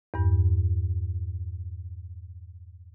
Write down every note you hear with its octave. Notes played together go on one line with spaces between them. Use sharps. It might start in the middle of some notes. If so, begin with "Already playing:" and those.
E2 G2